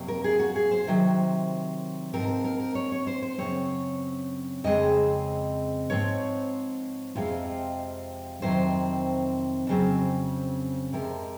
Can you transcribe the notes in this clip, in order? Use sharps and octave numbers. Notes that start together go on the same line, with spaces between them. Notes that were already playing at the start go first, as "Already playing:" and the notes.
Already playing: F2 C3 F#3 A#3
A#4
G#4
F#4
G#4
C5
C3 D#3 F#3
G#2 F3 C4 A#4
A#4
A#4
A#4
C#5
C#5
C5
C5
F#2 C#3 F#3 C4 C#5
F2 C#3 G#3 C4 D#5
G#2 F3 C4 C#5
F2 C3 F3 G#3 C4 F4
F2 C3 D#3 F#3 C4 C5
F2 C#3 F#3 C4
F2 C3 F3 G#3 A#4